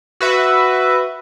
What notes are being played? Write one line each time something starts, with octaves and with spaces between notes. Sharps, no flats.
F#4 B4 E5